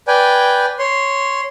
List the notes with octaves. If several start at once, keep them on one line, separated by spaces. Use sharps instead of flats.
B4 D5 G5 G#5
C#5 C6